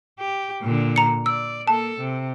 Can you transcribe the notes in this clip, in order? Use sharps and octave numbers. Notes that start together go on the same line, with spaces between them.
G4
A#2 D3
A#5 C#7
D5 E6
A#3 A4 A5
C3